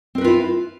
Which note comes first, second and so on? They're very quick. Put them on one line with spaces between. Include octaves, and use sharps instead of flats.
C4 A#4 B4 F4 E4